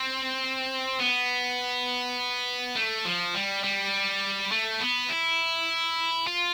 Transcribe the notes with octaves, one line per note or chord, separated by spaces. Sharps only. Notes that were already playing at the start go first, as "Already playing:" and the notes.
Already playing: C4
B3
A3
F3
G3
G3
A3
B3
E4
F4